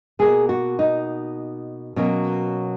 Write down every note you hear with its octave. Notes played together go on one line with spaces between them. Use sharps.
B2 A#3 G#4
F#4
D#4
B2 F#3 A#3 C#4